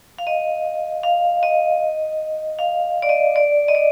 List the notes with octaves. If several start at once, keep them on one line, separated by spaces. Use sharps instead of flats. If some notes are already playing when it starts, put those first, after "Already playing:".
F5
D#5
F5
D#5
F5
D5
D#5
D5
D#5
D5